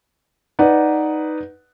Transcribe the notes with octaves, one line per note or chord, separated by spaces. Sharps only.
D#4 B4 D5 F#5